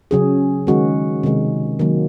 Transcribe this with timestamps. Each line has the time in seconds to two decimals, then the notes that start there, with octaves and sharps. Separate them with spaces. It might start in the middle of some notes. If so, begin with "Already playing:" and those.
0.11 C#3 F#3 C#4 G#4
0.67 D#3 G#3 C#4 F#4
1.23 C3 D#3 G#3
1.79 D#3 F#3 A#3